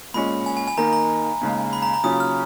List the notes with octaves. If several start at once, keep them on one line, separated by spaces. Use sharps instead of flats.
A#2 G#3 C#4 B5
G#5
G#5
G#5
D#2 D#3 A#3 D#4 A#5
A#5
D#2 C#3 G#3
B5
A#5
A#5
D#2 C#3 F#3 C#4 F4 D#6
F6